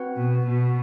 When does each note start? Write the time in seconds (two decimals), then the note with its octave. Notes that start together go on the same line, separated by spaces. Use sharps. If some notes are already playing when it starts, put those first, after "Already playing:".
Already playing: C4 F#4 B4 F#5
0.17 B2
0.46 B2